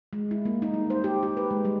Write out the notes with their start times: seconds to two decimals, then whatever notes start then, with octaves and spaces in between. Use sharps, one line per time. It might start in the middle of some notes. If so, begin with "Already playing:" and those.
0.13 G#3
0.31 E4
0.45 A#3
0.62 D#4
0.74 G3
0.90 C5
1.04 G4
1.23 G4
1.37 B4
1.50 G#3
1.65 G3